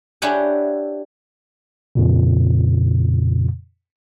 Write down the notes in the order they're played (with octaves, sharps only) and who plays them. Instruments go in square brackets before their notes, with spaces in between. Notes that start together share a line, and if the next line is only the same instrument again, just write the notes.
[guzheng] D4 E4 G4 C#5 F#5 G#5
[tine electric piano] F2 A#2 C#3